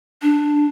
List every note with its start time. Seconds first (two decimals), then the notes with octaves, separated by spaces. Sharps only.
0.22 D4